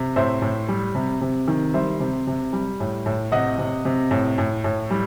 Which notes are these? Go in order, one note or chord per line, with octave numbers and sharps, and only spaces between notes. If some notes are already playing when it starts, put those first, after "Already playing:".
Already playing: C3
A2 C5 E5
A2
G3
C3
C3
D#3
G3 C5 E5
C3
C3
G3
A2
A2
C3 D#5 F#5
C3
C3
A2
A2
A2
G3